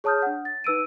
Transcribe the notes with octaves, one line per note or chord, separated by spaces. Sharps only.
G#4 C#5 A5 D#6 F6 G6
D4 F#5
A6
D#4 B4 E6 D7 D#7